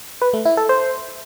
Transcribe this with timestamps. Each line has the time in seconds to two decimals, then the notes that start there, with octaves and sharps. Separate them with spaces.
0.22 B4
0.33 A3
0.45 E4
0.57 A4
0.69 C5